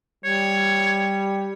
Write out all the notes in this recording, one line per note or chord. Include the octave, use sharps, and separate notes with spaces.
G3 C#5